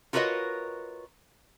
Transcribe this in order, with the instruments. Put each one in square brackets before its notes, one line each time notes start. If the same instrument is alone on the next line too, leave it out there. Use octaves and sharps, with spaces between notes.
[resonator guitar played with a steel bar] F4 F#4 A#4 B4 C#5 D#5